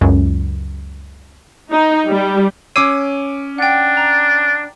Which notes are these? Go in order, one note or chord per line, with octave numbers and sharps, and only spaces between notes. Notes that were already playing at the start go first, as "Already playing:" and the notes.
C#2 F#2
D#4
G3
C#4 C#5 D6 E6 C7 D#7
D4 F#5 G5
A#5